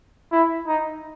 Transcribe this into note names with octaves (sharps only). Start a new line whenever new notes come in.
E4
D#4